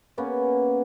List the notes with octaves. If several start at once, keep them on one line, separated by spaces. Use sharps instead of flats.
A#3 B3 C#4 G#4